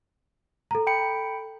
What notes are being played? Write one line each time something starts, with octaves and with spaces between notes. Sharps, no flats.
A4 A#5
G5 B5 C#7